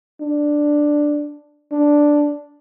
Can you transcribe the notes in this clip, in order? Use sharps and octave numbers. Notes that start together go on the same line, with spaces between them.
D4
D4